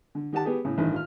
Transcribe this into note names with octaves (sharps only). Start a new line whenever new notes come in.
D3
D#3 G4 F#5 A5
B3 G4 G#4
A2 C#3
A1 G2 D#3
F4 F6